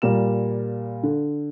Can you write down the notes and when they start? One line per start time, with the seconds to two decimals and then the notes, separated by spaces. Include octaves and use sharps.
0.02 A#2 G3 A#4 E7
1.03 D3